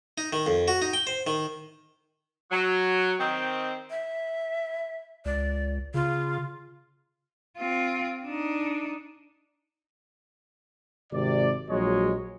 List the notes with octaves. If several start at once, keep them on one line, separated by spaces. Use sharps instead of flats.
D#4
D#3
F2
F#4
D#4
G5
C5
D#3
F#3
D#3 C4
E5
C#2 D5
C#3 F4
C4 F4
D4 D#4
G#1 C3 D5
A#1 F#3 G#3 C#5 D#5